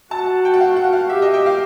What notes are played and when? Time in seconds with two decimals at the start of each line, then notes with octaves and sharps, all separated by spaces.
0.11 F#4 A5
0.45 G5
0.53 F#5
0.60 F5
0.76 F#5
0.93 F5
1.09 G4 E5
1.22 D#5
1.34 G5
1.46 F5